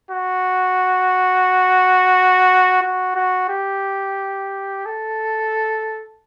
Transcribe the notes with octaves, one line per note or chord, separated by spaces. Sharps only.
F#4
F#4
F#4
G4
A4